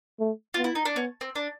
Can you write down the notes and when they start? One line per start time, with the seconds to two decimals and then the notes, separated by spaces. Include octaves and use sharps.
0.20 A3
0.54 B3 F4
0.64 E4
0.75 D#4
0.85 D4
0.96 B3 C#4
1.21 C4
1.36 D4